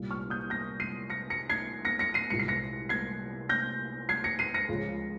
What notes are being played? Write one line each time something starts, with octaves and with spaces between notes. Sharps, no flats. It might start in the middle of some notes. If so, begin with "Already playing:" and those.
Already playing: C2 A#2 G3
C#6 F6
D#6 G6
G6 A#6
C7 D#7
A#6 C#7
A#6 C#7
G#6 C7
A#6 C#7
A#6 C#7
C7 D#7
C2 A#2 G#3 C#7
C7
A#6 C#7
G#6 C7
G6 A#6
G#6 C7
A#6 C#7
C7 D#7
A#6 C#7
C#2 C#3 F3 G#3